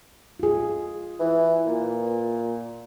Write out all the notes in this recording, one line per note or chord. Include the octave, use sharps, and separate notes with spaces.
F4 G#4
E3
A#2